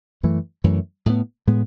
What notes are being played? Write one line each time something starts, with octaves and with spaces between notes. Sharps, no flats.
F#2 E3 A3
F#2 E3 A3
A2 G#3 B3
A2 G#3 B3